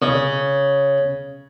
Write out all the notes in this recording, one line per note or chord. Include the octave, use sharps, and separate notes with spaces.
C#3